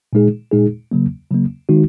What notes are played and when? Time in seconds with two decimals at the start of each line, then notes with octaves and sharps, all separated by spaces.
0.13 A#2 G#3 D#4 G#4
0.52 A#2 G#3 D#4 G#4
0.91 C#3 F#3 A#3
1.30 C#3 F#3 A#3
1.69 D#3 G#3 D#4 F#4